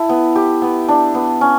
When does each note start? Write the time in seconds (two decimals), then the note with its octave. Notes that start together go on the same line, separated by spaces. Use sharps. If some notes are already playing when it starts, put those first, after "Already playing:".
Already playing: E4 A4
0.09 B3
0.36 G4
0.62 B3
0.89 D4
1.15 B3
1.41 C#4